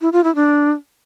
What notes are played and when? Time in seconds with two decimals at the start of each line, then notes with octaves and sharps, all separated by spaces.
0.01 E4
0.13 F4
0.24 E4
0.35 D4